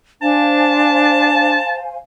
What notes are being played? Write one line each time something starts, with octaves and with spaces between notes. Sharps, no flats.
D4 C5 F5 G#5 A5